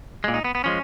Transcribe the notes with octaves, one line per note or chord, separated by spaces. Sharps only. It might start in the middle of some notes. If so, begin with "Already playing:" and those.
A#2 G#3
D#4
B3
B3
F3 G#3 C#4